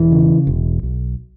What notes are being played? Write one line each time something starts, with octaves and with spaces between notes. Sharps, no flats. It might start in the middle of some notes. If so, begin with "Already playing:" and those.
Already playing: E1 E3
C#3
E1
B1